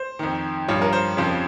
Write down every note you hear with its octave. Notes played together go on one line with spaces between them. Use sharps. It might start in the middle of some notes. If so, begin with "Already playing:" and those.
Already playing: C5
F2 D#3
G2 F3 C#5
A#4
C5
F2 C#3 F3